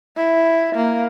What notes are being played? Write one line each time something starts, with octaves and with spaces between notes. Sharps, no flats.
E4
A#3